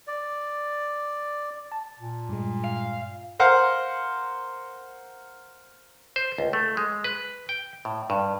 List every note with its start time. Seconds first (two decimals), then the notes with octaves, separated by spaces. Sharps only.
0.07 D5
1.72 A5
2.00 A#2
2.29 G2 G#3
2.64 F5
3.39 A#4 C5 F5 F#5
6.16 C5
6.38 C#2
6.53 A3
6.77 G#3
7.04 B4
7.49 G5
7.85 A2
8.10 G2